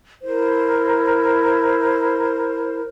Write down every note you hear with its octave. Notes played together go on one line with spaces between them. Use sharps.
E4 A#4 C5